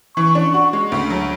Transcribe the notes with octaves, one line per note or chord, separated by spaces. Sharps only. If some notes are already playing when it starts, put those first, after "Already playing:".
E3 C#6
D4
F#4 C#6
G#3
D2
F#3